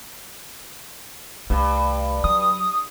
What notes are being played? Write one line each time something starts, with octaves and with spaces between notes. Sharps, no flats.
C2 G2 A3
F#3 D#6